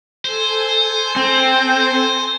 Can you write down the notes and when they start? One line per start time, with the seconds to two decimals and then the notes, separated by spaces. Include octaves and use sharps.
0.25 A4 C5 G#5
1.16 C4